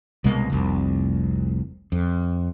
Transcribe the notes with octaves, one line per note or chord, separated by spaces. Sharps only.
C2 B2 G#3 A#3
F1 C2
F2